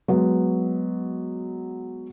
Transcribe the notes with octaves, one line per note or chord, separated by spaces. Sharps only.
F#3 G#3 B3